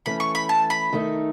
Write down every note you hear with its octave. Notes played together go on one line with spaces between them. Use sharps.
E3 A3 C#4 B5
C#6
B5
A5
B5
D#3 A3 D#4